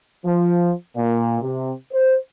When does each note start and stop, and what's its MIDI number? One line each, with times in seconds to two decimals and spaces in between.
0.25 0.72 53
0.95 1.38 46
1.41 1.72 48
1.92 2.16 72